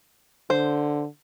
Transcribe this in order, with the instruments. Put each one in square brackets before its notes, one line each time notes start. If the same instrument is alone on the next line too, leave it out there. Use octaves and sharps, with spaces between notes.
[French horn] D3 [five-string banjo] C5